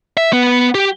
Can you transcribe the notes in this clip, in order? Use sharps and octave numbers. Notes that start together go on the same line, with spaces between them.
E5
B3
G4